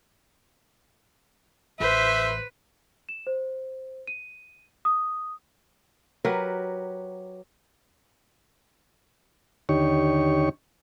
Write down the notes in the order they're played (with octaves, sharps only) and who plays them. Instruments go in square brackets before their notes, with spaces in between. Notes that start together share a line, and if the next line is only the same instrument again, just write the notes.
[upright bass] A1 [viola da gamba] B4 [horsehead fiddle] C5 [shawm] E5
[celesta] E7
C5
D#7
D#6
[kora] F#3 G4 A#4 B4
[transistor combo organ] D#2 D3 D#4 G4 C#5 C#6